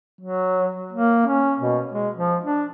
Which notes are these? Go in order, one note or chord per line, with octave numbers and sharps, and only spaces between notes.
F#3
A#3
C#4
B2
G#3
F3
D4